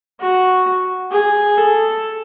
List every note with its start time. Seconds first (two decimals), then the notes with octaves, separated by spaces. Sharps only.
0.20 F#4
1.11 G#4
1.58 A4